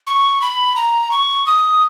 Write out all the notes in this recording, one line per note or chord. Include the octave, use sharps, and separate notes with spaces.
C#6
B5
A#5
C#6
D#6